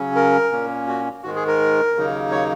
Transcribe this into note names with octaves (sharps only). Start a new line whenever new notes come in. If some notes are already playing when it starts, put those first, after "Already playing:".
Already playing: C#3 F#3 C#4
A#4
A#2 A#3 C#4
F#4
G#2 D#3 G#3 F#4
G#4
A#4
D#2 C#3 F#3 A#3 D#4
C#5